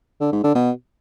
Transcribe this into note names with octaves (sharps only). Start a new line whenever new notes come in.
D3
G#2
D3
B2